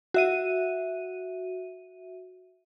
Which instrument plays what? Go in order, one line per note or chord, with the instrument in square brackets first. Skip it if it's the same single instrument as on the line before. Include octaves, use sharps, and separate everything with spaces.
[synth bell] F#4 E5 D#7